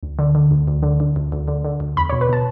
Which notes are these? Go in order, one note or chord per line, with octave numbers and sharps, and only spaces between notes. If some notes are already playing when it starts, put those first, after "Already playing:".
D2
D3
D3
D2
D2
D3
D3
D2
D2
D3
D3
D2
E2 B5
B2 C#5
B4
B2 A5